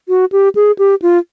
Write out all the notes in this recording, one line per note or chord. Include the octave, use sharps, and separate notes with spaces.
F#4
G4
G#4
G4
F4